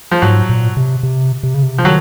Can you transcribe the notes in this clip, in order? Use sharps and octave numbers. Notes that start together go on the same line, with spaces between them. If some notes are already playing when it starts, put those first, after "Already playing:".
F3
G#2 F#3
A#2
C3
C3
C3
C#3
C3
F3
D#3 F#3